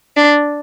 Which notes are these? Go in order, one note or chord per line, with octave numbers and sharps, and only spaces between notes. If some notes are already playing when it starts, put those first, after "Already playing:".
D4